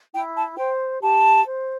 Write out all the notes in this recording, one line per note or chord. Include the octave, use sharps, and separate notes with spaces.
E4 G5
A5
C5 G5
G4 A5
C5